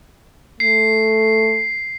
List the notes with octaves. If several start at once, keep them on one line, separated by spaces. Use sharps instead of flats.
A3 C7